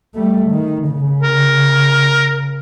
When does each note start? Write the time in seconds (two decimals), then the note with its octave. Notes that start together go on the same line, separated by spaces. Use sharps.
0.15 G3 A3
0.49 D#3
0.90 C#3
1.23 A#4